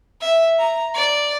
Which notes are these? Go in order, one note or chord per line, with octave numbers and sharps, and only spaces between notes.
E5
A#5
D5